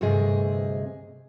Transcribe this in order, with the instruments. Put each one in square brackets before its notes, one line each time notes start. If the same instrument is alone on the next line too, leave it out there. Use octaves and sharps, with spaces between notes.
[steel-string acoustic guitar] D2 G2 C3 G#4 D#5